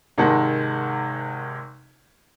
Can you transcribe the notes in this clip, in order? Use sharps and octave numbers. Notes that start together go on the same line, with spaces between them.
G#1 C3 D#3 G#3 F#5 A5